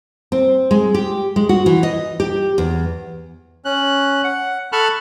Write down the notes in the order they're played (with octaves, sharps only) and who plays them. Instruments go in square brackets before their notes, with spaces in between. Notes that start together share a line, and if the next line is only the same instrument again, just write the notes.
[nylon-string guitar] C4
G#3
G4
G#3
F#4
E3
D#5
G4
E2
[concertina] C#4 F#6
F#5
A4 A5 B5 C#6 F6 F#6